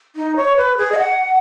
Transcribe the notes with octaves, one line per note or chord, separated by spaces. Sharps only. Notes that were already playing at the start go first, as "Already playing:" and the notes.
D#4
C#5
B4
G#4
D#5
F#5